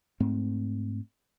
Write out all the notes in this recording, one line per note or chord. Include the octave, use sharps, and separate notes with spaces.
G#2 A3 C4